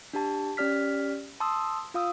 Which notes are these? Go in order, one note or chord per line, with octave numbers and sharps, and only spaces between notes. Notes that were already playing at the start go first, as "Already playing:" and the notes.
D4 G4 A5
C#4 G4 D5 F6 B6
A5 C6 D#6 E6
F4 F5 D#6 E6